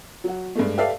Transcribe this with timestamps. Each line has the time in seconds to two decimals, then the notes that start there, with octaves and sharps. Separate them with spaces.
0.24 F#3 F#4
0.55 G2 G#3 A3
0.78 G4 A4 B4 D5 E5 F5